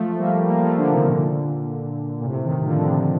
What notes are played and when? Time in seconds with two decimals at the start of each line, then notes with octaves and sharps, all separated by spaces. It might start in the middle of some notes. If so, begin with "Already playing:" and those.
Already playing: F3 A3
0.18 G3 A#3
0.47 G3 A#3
0.62 F3 A3
0.77 D3 F3
0.92 C3 D#3
1.07 A#2 D3
2.20 A#2
2.25 A2 C3
2.44 C3 D#3
2.64 D3 F3
2.78 D3
2.84 C3 D#3